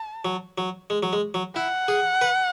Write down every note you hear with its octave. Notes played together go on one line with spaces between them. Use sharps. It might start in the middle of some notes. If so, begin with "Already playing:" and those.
Already playing: A5
F#3
F#3
G#3
F#3
G#3
F#3
E4 F#5
G#4
B4